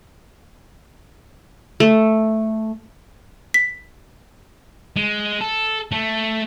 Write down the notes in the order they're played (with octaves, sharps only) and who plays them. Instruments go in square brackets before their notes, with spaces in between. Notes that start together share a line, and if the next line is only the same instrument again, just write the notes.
[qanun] A3
[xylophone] B6
[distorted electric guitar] G#3
A4
A3